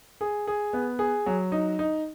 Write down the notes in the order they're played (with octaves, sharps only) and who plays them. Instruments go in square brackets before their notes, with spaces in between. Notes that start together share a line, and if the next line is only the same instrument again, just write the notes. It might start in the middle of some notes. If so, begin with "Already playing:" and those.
[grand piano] G#4
G#4
B3
G#4
F#3
D#4
D#4